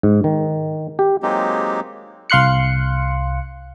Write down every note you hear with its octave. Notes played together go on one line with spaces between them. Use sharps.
G#2
D#3
G4
F#3 G#3 A#3 C4 D#4 G4
C2 F5 C6 F#6 C#7